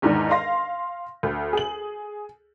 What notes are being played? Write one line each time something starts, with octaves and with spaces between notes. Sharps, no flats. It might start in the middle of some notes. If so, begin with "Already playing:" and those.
E2 G#2 D#3 D4 D#4
F5 C6 A#6
D2
G#4 F#7